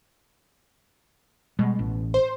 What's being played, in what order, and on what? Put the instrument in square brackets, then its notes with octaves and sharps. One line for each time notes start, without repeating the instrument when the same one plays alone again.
[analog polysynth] B2 [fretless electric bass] G3 G#3
[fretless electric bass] A1
[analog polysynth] C5